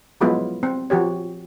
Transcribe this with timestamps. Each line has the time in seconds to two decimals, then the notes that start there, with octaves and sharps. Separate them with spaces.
0.21 F3 F#3 G#3 B3 E4 F4
0.63 C4
0.90 F3 F#4 G4 C#5